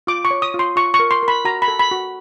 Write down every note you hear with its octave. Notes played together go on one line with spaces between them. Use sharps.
F4 D6
C#6
C#5
D#6
F4
C6
F4 C#6
C#6
A#4
C6
A#4
B5
F#4 A#5
B5
A4
B5
F#4